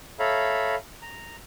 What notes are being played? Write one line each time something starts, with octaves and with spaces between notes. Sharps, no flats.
A4 C#5 E5 F5 A#5 B5
A#5